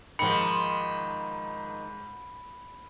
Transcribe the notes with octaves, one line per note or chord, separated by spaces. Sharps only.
G#2 D#3 F3 B5 C#7